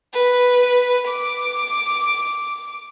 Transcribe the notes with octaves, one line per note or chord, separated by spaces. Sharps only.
B4
D6